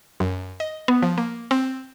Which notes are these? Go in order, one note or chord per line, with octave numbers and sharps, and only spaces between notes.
F#2
D#5
B3
F3
A#3
C4